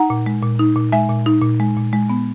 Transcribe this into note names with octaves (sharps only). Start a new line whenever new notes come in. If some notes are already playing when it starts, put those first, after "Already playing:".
Already playing: D#4 F#5 A#5
A#2
G#3
A#2
D#4
A#2
G#3 E5 G#5
A#2
D#4
A#2
G#3
A#2
G#3
B3